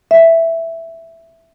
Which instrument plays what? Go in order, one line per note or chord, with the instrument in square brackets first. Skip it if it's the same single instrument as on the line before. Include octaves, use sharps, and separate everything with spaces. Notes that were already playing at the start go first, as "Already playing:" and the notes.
[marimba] E5